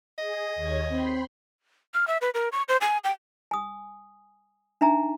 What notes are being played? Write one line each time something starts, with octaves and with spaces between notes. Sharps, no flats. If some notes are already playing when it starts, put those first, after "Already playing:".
G#4 D#5
D#2 C#5 G#6
C4 G5 B5 C6
F6
E5
B4
A#4
C#6
C5
G#5
G5
G#5 D#6
D4 D#4 E5 G#5 A#5